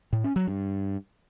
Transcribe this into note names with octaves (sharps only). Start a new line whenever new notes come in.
A2
C#4
F#3
G2